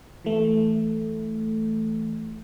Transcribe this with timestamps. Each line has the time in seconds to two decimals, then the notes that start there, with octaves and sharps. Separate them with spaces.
0.25 E3 A3